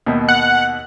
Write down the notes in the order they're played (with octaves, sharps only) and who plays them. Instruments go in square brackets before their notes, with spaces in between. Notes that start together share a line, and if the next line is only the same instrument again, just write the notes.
[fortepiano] D#2 B2
[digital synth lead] F#5